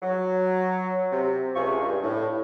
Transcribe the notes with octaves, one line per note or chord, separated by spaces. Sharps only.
F#3
C3
C#2 C3 F4 G#4 C#6
G2
A2